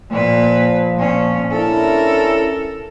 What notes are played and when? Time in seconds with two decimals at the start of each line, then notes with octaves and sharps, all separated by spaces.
0.10 A#2 F3 B4
0.98 A#2 C#4
1.51 C#4 D4 E4 A4 A#4